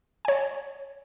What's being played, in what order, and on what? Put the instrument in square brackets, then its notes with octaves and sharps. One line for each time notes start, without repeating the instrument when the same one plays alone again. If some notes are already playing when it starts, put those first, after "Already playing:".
[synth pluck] C#5 G#5